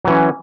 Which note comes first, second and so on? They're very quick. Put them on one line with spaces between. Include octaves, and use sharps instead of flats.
F#3 E3 C#4